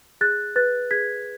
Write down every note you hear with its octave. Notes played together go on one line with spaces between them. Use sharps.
G#4 F#6 A6
B4 F#6 A6
G#4 G#6 B6